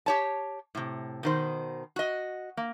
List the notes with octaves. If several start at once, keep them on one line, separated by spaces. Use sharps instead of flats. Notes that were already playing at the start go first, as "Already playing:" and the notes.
G4 C#5 A5
A2 C3
B2 D#3 C5
F#4 D#5
A#3